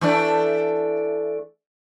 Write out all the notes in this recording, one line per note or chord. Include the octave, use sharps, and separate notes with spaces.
E3 A3 D4